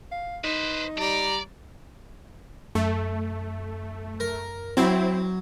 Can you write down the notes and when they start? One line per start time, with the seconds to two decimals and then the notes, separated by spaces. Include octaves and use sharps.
0.12 F5
0.44 D#4 B4 C5
0.98 G3 D5 A#5
2.75 F#2 A3
4.20 A#4
4.77 F#3 C4 E4